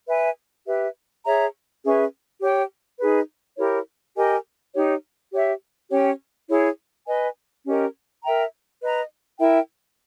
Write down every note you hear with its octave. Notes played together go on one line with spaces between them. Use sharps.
B4 E5 G#5
G4 B4 E5
G#4 C#5 E5 A#5
C#4 G#4 B4 E5
G4 C#5 G5
D#4 G#4 B4
E4 G4 A#4 C#5
G4 A#4 D#5 G#5
D#4 G4 C#5
G4 C#5 E5
C#4 G4 C#5 G5
E4 G#4 C#5
B4 D#5 G#5
C#4 G4 A#4 D#5
A#4 E5 G5 A#5
B4 D#5 A#5
E4 A#4 E5 G5